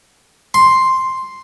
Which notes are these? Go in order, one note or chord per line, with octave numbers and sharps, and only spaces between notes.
C6